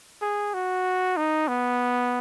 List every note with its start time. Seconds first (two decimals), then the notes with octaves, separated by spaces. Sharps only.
0.21 G#4
0.54 F#4
1.17 D#4
1.48 B3